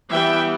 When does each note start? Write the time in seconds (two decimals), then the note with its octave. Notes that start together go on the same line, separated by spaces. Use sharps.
0.11 E3 G3 B3 E5 G5